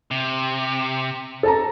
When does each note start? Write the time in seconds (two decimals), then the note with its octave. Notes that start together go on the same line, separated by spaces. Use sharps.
0.11 C3
1.43 A4 A5 A#5